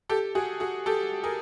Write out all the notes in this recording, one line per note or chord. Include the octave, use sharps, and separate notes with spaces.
G4 A4
F#4 G#4
F#4 G#4
G4 A4
G#4 A#4